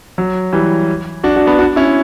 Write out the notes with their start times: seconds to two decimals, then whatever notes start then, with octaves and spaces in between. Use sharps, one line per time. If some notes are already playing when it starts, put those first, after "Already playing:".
0.18 F#3
0.53 E3 G3
1.24 D4 F#4
1.36 D4 F#4
1.47 B3 D4
1.59 D4 F#4
1.76 C#4 E4